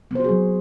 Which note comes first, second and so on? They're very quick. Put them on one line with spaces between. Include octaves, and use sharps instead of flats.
B3 C5 F#4 G#4 F#3